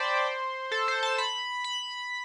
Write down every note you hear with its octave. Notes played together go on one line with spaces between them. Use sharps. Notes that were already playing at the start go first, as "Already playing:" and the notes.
Already playing: C5 D5 G5 A5 B5
A4
C5
A5
B5
B5